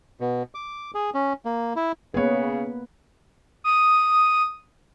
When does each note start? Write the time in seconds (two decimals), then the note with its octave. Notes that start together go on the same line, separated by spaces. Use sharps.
0.20 B2
0.55 D6
0.95 G#4
1.14 C#4
1.45 A#3
1.76 E4
2.14 C#3 A#3 B3 G#4 B4 C#5
3.64 D#6